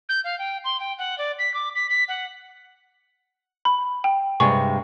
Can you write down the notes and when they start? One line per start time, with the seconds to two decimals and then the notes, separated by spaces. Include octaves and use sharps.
0.09 G6
0.24 F5
0.39 G5
0.64 C6
0.80 G5
0.99 F#5
1.18 D5
1.39 B6
1.54 D6
1.76 B6
1.89 B6
2.09 F#5
3.65 B5
4.04 G5
4.40 G2 C3 G#3 C#6